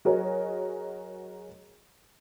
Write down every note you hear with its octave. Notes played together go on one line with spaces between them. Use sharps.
F#3 F#4 G#4 A#4 C#5 D#5